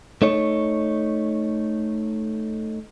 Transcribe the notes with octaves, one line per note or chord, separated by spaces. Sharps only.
A3 D#4 C#5